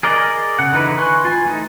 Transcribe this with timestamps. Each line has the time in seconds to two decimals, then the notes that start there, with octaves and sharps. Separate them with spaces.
0.03 G#4 A#4 D5 D#5
0.59 C#3 F#5
0.73 D3 E3 D#4 B4
0.98 B4 G#5 C6 C#6 F#6
1.25 F4 G#5
1.45 E3 A3 D#4